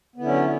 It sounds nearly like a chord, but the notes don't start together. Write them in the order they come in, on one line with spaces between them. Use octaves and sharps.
B3 D3 E4 C#4 F#3